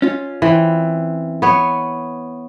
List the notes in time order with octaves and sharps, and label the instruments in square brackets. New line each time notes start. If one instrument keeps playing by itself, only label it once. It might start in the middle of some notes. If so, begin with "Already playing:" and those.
[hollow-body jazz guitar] C#4 F4
[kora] E3 C4
B3 C#5